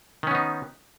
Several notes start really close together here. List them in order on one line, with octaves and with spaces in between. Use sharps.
D#3 C#4 B3 D#4